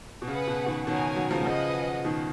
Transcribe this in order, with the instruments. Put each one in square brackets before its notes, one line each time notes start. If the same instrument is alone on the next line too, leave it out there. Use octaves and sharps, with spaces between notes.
[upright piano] B2
[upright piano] C#3 [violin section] G#4 B4 F#5
[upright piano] B2
B2 D#3
[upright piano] B2 D#3 [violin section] B3 F#4 A#4 C#5 G#5
[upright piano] D#3 F#3
C#3 F3
F#3
[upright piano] C#3 F3 [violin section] G#4 B4 D#5 F#5
[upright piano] B2 D#3